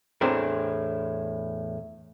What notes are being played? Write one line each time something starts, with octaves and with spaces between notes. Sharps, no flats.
E2 A2 C4 D4 A#4